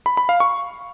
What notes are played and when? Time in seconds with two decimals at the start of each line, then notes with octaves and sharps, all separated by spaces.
0.06 B5
0.17 B5
0.29 F5
0.40 C#6